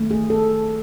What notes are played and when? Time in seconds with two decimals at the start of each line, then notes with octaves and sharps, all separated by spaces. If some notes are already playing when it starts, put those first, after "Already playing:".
Already playing: D#3 A3
0.11 G#4
0.30 A4